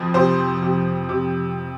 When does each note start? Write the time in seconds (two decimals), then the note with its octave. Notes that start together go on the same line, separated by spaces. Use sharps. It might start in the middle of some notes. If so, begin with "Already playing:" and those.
Already playing: F2 F3
0.14 C3 C5
0.63 C3
1.09 C3